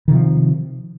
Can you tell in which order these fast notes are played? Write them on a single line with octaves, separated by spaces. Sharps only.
D#3 C3 F3